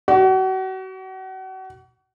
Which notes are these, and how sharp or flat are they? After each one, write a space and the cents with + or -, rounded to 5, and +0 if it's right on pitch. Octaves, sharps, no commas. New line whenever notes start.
F#4 +35